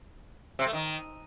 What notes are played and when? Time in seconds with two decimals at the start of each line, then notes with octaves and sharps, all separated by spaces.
0.59 C3
0.66 A3
0.73 D#3